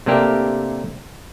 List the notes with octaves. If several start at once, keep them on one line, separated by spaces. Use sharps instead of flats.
C3 A3 A#3 D4 G4 A#4